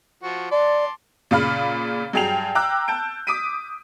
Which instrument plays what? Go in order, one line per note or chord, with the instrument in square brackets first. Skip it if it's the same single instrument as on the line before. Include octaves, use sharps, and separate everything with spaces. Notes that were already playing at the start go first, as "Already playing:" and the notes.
[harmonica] F3 F#4
[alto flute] D5 [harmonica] A5 C6 D6
[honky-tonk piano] A#2 C#3 F5 B5 F6
G2 F#3 G#4 G5 C7 F7
G5 A#5 D6 E6 F#6
A5 G6 D7
D6 D#6 B6 D7 D#7